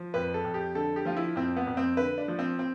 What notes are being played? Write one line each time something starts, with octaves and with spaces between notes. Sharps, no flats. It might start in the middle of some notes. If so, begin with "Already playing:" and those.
Already playing: F3
F2 B4
A4
F2
G4
D3 A4
G4
F3 F4
E4
F2 C4
B3
F2
C4
D3 B4
D4
F3
C4
C4